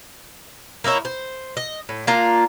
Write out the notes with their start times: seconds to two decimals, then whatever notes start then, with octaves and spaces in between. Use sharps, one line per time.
0.84 A#3 D#4 E4 C#5
1.05 C5
1.57 D#5
1.89 A2
2.07 A#3 D4 F4 A#4